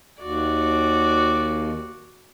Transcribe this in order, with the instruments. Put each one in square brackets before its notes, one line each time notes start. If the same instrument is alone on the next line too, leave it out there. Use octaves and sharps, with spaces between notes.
[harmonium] D#2 [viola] F#4 D5